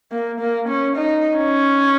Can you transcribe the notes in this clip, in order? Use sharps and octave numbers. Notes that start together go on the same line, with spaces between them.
A#3
A#3
C#4
D#4
C#4